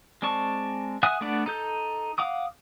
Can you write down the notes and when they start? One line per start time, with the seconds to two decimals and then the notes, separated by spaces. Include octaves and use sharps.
0.22 G#3 C4 D5 A5 C#6
1.03 E5 F#5 G#5 D#6 F#6
1.21 A3 B3 D4 D5 F#5
1.46 D#4 A4 G6
2.18 F5 F#5 D6 D#6